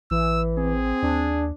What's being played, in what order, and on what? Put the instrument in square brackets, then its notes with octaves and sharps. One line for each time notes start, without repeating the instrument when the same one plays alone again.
[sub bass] A1 [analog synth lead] E3 [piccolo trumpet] E6
[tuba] C4 [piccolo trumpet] G#4
[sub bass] D#2 [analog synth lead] D4